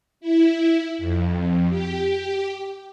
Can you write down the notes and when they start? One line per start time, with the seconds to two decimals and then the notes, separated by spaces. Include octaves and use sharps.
0.20 E4
0.98 F2
1.69 G4